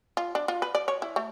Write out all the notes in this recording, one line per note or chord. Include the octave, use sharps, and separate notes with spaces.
F4
D4
F4
B4
D5
C#5
E4
A3